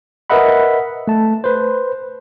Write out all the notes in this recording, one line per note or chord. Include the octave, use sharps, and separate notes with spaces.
A#4 B4 D#5 E5 F#5 B5
A3 A5
B4 C5